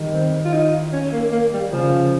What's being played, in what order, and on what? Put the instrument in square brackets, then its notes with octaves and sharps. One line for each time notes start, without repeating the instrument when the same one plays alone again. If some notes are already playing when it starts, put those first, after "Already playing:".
Already playing: [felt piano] D#3 G3
[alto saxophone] C4
F4
D#4
C#4
A#3
A#3
G3
[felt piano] C#3 [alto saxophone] F3